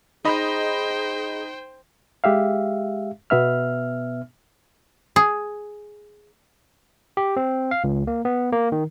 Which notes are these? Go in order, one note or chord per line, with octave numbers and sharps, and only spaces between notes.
D#4 G#4 C5 D#5 G5 B5
G#3 G4 E5 F5
B2 B3 E5 F6
G#4
G4
C4
F5
C#2
A#3
B3
A#3
D#3